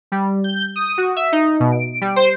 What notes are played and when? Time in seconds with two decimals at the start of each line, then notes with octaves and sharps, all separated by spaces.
0.12 G3
0.44 G6
0.76 D#6
0.98 F#4
1.16 E5
1.32 D#4
1.60 B2
1.72 D7
2.01 G3
2.16 C5